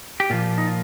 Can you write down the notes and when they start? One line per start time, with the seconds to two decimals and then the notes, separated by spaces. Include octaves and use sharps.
0.20 G4
0.30 A#2 F3 F4
0.58 D#4
0.67 F4